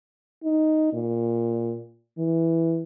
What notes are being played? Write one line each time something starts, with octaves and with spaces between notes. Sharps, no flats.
D#4
A#2
E3